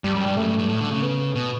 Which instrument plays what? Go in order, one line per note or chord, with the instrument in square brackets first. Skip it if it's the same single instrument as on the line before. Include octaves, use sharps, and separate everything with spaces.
[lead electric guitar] G2 [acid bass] G3
[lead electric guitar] F#2
G2
[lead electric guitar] F#2 [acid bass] A3
[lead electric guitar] G2
G2
A2
D3
C#3
[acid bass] B3
[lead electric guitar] B2